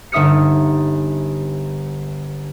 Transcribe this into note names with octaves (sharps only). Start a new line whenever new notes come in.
G1 D#4 E5 D#6 F6 C#7